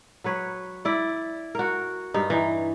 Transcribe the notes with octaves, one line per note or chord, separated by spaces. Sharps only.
F#3 B4 C#5
E4 D5
F#4 A#4
G2 D#4
E3 D#4